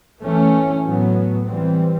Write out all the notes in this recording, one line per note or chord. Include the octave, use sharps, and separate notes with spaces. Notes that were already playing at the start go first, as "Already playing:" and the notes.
E3 A3 C#4
A2 F#3 B3
E3 G3 C4